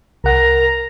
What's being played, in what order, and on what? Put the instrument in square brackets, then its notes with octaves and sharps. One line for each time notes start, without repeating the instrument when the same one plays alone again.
[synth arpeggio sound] C2 F#5 [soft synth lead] A#4 [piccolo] A#5